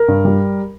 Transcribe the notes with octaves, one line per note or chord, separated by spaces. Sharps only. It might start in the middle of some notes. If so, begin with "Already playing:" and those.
Already playing: A#4
G2
G3